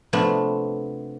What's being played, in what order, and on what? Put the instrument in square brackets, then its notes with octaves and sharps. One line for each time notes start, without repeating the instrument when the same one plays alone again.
[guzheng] C3 F3 A3 B3 D4